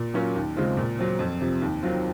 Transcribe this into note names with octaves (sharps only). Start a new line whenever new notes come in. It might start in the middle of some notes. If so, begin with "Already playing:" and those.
Already playing: A#2
F#3 A#3 C#4 F4
D#2
C#3 G#3 C4 F4
A#2
F#3 C4
F2
C3 F3
D#2
D#3 F#3 C4 F4